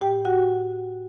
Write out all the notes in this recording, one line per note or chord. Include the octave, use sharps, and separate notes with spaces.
A2 G4 G5
F#4 F#5